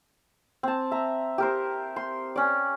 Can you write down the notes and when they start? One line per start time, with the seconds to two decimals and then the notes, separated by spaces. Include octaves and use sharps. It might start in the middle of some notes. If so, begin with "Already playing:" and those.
0.63 C4 A5
0.91 E5 A#5
1.38 G4 A#4 C5
1.96 C6
2.36 C#4 D5